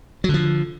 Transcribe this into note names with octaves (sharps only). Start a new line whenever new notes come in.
D3 F3 F#3